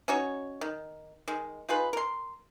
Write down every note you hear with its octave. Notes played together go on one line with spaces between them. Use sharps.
C#4 D#4 F#4 C#5
D#3
D#3 G#3
D#4 F4 G#4 B4
A#4 C6